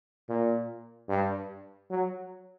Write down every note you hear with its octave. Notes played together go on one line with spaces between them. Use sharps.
A#2
G2
F#3